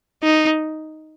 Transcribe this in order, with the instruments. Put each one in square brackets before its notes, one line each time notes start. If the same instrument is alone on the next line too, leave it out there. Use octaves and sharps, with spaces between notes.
[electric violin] D#4